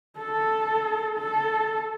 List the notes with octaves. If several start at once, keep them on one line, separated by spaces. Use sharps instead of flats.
A4
A4